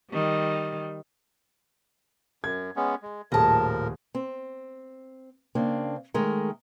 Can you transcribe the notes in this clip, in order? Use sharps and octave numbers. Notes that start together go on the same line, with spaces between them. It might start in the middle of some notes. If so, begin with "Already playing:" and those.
D#3 G3
F#2 G#6
G#3 B3 C#4
G#3
D#1 A2 F3 G#4 A#4 A5 A#5
C4
C#3 A#3 C4 D4
D#3 G#3 A3 A#4